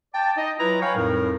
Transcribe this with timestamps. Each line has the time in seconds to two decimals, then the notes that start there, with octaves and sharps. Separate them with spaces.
0.14 D5 G5 A5
0.37 D#4 D#5
0.59 F#3 E4 F4 B4 A#5
0.82 B4 C#5 F5 G5 G#5 C#6
0.95 F2 A2 G3 D#4 A#4